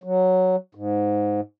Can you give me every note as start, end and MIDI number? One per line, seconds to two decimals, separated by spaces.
0.04 0.56 54
0.75 1.41 44